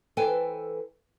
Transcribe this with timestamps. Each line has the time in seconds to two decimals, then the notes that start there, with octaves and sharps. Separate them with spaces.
0.17 E3 A4 B4 C5 G5 G#5